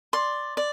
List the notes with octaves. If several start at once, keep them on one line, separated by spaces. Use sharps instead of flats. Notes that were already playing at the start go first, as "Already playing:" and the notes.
D5 C6
D5